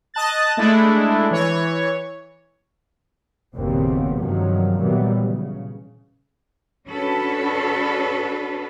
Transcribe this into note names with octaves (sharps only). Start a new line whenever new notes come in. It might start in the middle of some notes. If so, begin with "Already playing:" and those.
D#5 A5 F#6 A6
G#3 A3 D4 E4
E3 C#5
F#1 D#2 A#2 C#3 B3 C4
G2 C3 D#3 F3 F#3 G#3
A#2 D#3 E3 F#3 G3 B3
C#3
C#4 D4 F#4 A4 B4